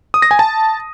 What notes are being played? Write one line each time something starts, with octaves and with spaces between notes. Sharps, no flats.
D#6
A#6
G#5
A5